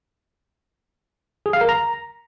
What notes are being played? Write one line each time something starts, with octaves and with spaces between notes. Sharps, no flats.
G#4
F5
A#4
A#5